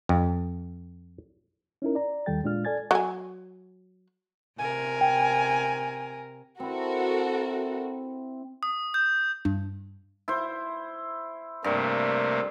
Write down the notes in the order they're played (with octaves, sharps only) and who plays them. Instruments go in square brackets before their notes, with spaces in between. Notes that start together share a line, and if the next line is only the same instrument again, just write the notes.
[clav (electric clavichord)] F2
[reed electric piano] C#4 D#4 E4 A#4
D5 A#5
D#2 D#3 G3 A4 G5 A6
A#2 G#3 D4 F4 F6
A4 D5 G#5 G#6 A6
[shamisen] F#3 G#5
[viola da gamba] C3 A#4 [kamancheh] G#5
[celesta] G5
[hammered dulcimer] C4 E4 [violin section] F#4 A4 A#4
[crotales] D#6
G6
[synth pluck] G2
[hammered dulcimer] E4 C5
[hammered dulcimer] G2 [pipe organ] C3 A3 A#3